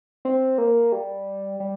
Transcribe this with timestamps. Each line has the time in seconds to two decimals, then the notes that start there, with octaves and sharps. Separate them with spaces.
0.25 C4
0.58 A#3
0.92 G3
1.60 G3